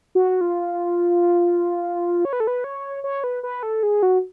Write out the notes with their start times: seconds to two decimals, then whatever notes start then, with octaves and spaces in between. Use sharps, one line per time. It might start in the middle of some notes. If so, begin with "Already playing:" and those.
0.15 F#4
0.41 F4
2.25 C#5
2.33 B4
2.40 A4
2.47 B4
2.64 C#5
3.04 C#5
3.24 B4
3.43 B4
3.63 A4
3.83 G#4
4.03 F#4